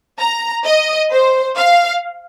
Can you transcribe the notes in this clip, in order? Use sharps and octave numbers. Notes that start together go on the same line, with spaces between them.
A#5
D#5
C5
F5